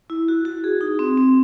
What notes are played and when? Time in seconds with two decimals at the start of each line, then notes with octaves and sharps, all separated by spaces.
0.10 E4
0.28 F#4
0.45 F#4
0.64 G#4
0.81 D#4
0.99 C4
1.17 C4